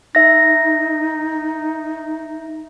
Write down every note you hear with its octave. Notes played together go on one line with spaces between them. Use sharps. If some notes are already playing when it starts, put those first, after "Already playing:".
D#4 E5 A#6